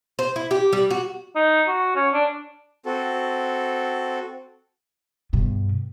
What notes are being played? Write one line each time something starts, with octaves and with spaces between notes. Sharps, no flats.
C5
E4
G4
G3
F#4
D#4
F#4
C#4
D4
C4 F#4 A4
G2 B2